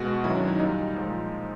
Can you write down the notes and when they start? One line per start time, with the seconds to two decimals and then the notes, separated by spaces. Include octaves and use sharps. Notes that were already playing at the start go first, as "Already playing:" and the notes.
Already playing: B2 G#3 F#4
0.24 F#2 D#3 F#3 E4
0.35 D4
0.47 D#4
0.59 A#2 G3 D#4
0.94 A#2 F3 G#3